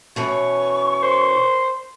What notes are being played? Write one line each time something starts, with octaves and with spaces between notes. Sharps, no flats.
B2 E3 C#4 C#6
C5